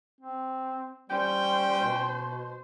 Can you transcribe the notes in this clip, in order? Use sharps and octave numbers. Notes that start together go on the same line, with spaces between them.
C4
G3 C#4 C5 G5
B2